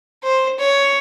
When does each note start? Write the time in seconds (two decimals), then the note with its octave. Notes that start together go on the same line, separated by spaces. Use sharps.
0.23 C5
0.59 C#5